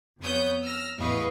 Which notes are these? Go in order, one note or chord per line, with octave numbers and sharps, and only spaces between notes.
F2 B3 C#5 D#6 G6
E6 F6 A#6
A1 E2 B4 D#5 F5 C#6